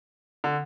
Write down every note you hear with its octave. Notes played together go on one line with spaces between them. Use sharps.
D3